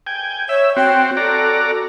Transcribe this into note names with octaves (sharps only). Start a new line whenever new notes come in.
G5 G#5
C#5 E5
C4 F#4 G5
F#4 A4 D5 A#5